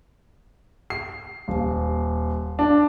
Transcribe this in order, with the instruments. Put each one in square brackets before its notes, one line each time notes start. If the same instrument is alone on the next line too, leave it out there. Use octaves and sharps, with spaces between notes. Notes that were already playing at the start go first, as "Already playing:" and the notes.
[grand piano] C7
D#1
D4